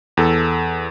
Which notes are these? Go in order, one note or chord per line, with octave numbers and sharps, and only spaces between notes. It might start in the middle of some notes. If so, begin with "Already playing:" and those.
E2 A4